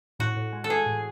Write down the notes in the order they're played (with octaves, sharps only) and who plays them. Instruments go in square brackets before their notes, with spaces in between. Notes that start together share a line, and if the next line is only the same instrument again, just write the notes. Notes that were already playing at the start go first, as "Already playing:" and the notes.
[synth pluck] A2 [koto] F#4
[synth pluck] A2
G#3
[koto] A4
[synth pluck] E3 [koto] G#4
[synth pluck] A2